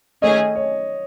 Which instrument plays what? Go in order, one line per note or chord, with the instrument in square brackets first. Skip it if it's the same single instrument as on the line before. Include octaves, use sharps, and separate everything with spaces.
[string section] D#3 A3 C#4 G#4 C#5 [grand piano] D#5
[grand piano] C#5